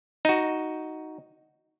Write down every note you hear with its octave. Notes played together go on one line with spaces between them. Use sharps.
D#4 F#4